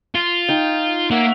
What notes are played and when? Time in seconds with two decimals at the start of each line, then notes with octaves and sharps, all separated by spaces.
0.15 F4
0.48 D#4 G5
1.11 A#3 C#5 E5 F#5